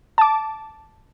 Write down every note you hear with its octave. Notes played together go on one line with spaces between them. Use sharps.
A5 D6